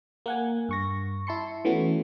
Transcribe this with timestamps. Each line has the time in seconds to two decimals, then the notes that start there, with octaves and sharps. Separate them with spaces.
0.26 A#3 F#5 G#5
0.69 G2 C#6 A#6
1.27 E4 A5 C6 C#7
1.65 E3 A3 B3 C#4 F#4